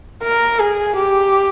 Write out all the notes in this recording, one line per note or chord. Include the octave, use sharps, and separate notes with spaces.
A#4
G#4
G4